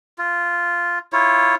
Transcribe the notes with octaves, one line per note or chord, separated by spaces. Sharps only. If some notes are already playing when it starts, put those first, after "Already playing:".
F4
E4 F4 C#5